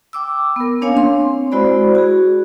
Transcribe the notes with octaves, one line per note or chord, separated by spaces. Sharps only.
G5 D6 E6
B3 A#4
A#3 C#4 D4 C#5 F5 G#5
C4 C6
G#3 E4 F#4 C5 D5 B5
F#4 G#4